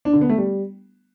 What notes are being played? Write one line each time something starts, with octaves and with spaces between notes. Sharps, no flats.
D4
D3
B3
A3
G3